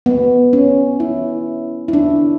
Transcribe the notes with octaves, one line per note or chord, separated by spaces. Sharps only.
B3
C#4
E4
E4
D4